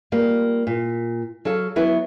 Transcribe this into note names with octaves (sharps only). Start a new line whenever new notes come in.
G3 A#3 F4
A#2
F#3 A4 F5
F#3 B3 E4 B4